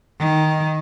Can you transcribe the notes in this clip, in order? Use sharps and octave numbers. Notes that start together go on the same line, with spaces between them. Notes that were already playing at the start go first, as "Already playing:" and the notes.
D#3